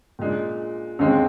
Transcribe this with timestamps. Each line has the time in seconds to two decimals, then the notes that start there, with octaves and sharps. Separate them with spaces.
0.19 A#2 G#3 D4
0.99 D#2 D3 G#3 C4